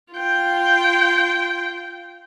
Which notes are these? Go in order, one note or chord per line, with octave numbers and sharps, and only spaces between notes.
F4 G5